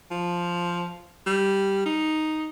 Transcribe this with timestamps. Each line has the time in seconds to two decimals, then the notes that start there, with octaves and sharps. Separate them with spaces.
0.11 F3
1.27 G3
1.86 D#4